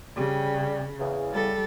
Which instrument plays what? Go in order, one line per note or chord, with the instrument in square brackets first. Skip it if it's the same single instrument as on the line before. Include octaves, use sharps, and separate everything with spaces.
[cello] C#3 [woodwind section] G3
[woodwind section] E2 C#3
[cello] G3 A4